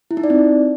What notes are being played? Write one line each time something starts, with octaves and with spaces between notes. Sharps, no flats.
E4
D#4
D5
C4